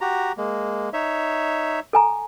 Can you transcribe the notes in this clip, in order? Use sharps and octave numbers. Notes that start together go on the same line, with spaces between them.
F#4 G4 A#5
G#3 A#3
D#4 C#5 E5
A4 G#5 A#5